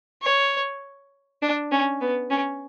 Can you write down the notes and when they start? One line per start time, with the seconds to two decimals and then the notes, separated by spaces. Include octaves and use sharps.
0.23 C#5
1.42 D4
1.71 C#4
2.01 B3
2.30 C#4